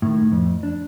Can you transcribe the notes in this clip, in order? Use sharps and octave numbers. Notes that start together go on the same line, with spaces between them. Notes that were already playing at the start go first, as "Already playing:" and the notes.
A2 D#3
F2
D4